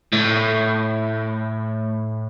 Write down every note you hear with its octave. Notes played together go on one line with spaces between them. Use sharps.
A2